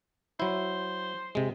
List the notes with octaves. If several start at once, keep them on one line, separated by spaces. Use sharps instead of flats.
F#3 E4 C5
C3 G#3